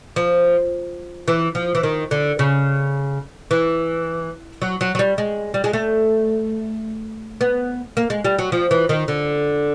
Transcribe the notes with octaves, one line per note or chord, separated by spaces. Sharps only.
F3
E3
F3
E3
D#3
D3
C#3
E3
F#3
F#3
F#3
G3
G#3
G3
G#3
A3
B3
A#3
G#3
G3
F#3
F3
E3
D#3
D3